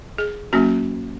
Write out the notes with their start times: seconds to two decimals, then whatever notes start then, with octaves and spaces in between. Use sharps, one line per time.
0.18 G#4
0.53 F#3 A#3 C#4 F#4